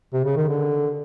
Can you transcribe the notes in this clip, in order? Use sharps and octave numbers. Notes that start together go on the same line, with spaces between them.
C3
C#3
D#3
D3